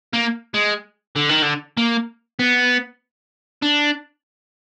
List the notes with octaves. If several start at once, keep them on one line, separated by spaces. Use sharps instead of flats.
A#3
G#3
D3
D#3
D3
A#3
B3
D4